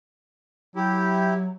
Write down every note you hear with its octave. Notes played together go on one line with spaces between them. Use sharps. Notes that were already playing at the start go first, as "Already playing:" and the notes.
F#3 E4 G4